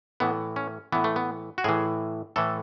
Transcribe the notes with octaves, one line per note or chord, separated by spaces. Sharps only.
A2 E3 B3
C#4
A2 E3 B3
A3
B3
F#4
A2 E3 G#4
A2 E3 A4